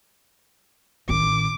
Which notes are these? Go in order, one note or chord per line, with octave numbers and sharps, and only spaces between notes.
A1 D#3 D6